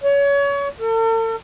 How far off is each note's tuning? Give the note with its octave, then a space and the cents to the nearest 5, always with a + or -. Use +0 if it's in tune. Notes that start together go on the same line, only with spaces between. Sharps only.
C#5 +30
A4 +45